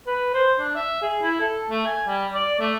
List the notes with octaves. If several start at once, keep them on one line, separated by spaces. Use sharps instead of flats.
B4
C5
D4
E5
G#4
E4
A4
A3
G#5
G3
D5
A3